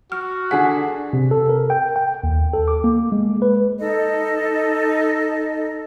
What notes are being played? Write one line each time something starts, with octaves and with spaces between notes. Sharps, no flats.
F#4 F6
D3 G#4 F#5 B6
C3
A4
A#4
G5
G5
D#2
A4
D6
A#3
G#3
B4
D#4 A4 D#5